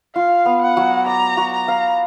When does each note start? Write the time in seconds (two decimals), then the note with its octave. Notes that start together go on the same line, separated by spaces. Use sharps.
0.15 F4 F5
0.46 B3
0.62 F#5
0.77 F#3
1.06 D5 A#5
1.37 F#4
1.52 A#5
1.68 F5